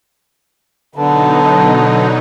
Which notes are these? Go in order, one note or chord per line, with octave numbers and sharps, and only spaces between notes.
B2 D3 F#3 D#4 B4 A5